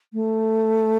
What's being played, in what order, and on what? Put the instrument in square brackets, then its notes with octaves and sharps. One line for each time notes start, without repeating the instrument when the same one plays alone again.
[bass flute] A3